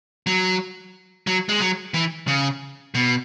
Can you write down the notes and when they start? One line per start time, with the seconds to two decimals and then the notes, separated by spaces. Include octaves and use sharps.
0.26 F#3
1.27 F#3
1.49 G#3
1.60 F#3
1.94 E3
2.27 C#3
2.94 B2